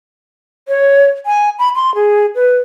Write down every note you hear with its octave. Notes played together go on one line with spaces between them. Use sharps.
C#5
G#5
B5
C6
G#4
B4